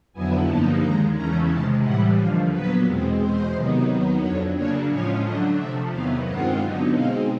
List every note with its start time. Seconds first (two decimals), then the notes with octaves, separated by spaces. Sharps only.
0.13 F2 D3 F#3 B3 E4 G#5
0.47 G2 D3 F3 A#3 D#4 A5
0.81 D#2 D#3 G#3 A#5
1.15 E2 C#3 E3 A3 C#4 A#5
1.49 C3 D#3 G#3 A5
1.83 A2 E3 G3 F#5
2.17 D#2 D3 F3 F5
2.51 A#2 F#3 B3 B4
2.85 E2 B2 G#3 C4
3.19 E2 B2 G#3 C5
3.54 C3 D#3 F#3 B3 D#4
3.87 D#2 D#3 F#3 B3 D#4
4.21 F2 D3 F#3 C#5
4.55 C#3 F#3 A#3 D4 C#5
4.88 A2 F3 G#3 C#4 F4 C#5
5.22 D3 F#3 A3 D4 D#5
5.57 C3 F3 A3 E5
5.91 E2 C3 D#3 F#3 B3 F5
6.25 G2 D#3 G#3 C4 F4 F#5
6.59 D3 F#3 B3 D#4
6.93 B2 G#3 C4 D#4 F5